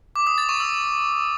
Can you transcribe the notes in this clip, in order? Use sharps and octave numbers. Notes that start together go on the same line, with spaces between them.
D6
D#6
A6
C#6
E6